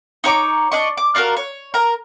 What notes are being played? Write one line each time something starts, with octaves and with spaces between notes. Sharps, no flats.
D#4 C#5 A#5 D6
D4 D#5 C#6
D6
D4 F4 F#4 A#4
C#5
A#4 A#5